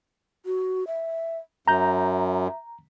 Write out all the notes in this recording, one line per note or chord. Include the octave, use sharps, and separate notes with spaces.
F#4
E5
F#2 E5 A#5 G6